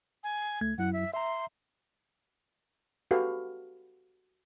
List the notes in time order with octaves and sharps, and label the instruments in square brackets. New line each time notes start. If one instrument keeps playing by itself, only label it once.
[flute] G#5
[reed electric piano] C#2 A3 G#6
[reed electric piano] F#2 F#3 E4 [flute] F#5
[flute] E5
[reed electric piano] E5 A#5 [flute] C6
[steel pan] F#4 G4 A4 B4 F5